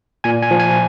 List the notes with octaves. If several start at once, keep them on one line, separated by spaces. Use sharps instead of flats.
A#2 G#5
G#5
F3
G#5